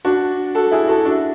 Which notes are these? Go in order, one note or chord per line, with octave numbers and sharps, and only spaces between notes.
D4 F#4
F#4 A4
E4 G#4
F#4 A4
D4 F#4